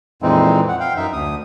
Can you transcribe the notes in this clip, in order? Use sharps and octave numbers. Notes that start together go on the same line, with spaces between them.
F2 A#2 E3 G#3 C4 D#4
F#5
F5 G5
F#2 D#4 E5
D2 D#6